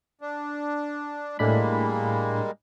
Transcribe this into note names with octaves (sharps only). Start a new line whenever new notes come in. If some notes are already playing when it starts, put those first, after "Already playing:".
D4
A2 G3 G#3 A#3 D4 B5